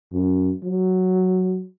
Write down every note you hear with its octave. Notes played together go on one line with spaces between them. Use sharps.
F#2
F#3